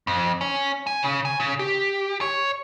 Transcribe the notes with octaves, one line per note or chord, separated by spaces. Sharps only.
F2
C#4
G#5
C#3
G#5
C#3
G4
C#5